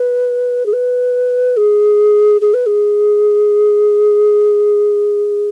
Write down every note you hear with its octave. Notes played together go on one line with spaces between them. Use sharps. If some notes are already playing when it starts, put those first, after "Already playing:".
Already playing: B4
G#4
B4
G#4
G#4
B4
G#4